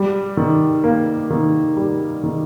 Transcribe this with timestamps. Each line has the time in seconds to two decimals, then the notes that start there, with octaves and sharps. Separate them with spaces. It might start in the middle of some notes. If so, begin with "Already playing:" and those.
Already playing: G3
0.37 D#3
0.84 A#3
1.30 D#3
1.77 G3
2.24 D#3